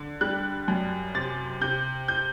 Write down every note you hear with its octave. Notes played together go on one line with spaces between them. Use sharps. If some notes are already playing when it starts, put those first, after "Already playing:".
Already playing: D3
G3 F#6
F#2
C3 A6
C3 G6
G6